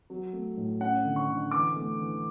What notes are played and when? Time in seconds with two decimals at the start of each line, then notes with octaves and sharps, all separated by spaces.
0.10 F#3
0.33 A3
0.57 A2
0.80 C#4 F#5
1.05 D3
1.16 C#6
1.28 D3
1.51 E3 D6
1.76 A3
1.99 E3